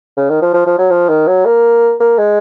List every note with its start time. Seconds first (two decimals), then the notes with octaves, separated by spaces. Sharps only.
0.17 C#3
0.30 D#3
0.42 F3
0.54 F3
0.66 F3
0.78 F#3
0.90 F3
1.09 D#3
1.27 F#3
1.45 A#3
2.00 A#3
2.18 G#3